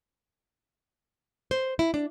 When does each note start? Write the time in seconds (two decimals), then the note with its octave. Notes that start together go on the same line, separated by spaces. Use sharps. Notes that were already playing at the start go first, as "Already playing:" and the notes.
1.51 C5
1.79 E4
1.94 D4